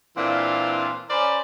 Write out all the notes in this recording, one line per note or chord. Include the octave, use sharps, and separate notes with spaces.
A#2 E3 C4 D4 F4 F5
C#4 A#4 C5 D5 B5